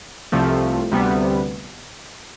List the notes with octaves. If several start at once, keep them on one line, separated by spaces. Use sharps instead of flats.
C2 C3 F3 A3
D2 C3 G3 B3